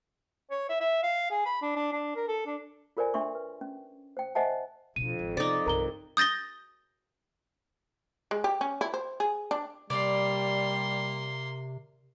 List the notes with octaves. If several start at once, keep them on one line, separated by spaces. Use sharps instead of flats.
C#5
E5
E5
F5
G#4
B5
D4
D4
D4
A#4
A4
D4
F4 A4 A#4 C5 D5 G#5
D4 E5 C6 C#6
B4
C#4
C5 G5
C5 D#5 E5 F#5 G#5 A5
F2 B2 D4 D#7
G#1
C3 D#4 D5
C2 G2 A#4 A#5 G7
D#6 G6 A6 A#6 G7
G#3
G4
C#4
E4
C5
G#4
D4
C3 G3 A#3 D5 C6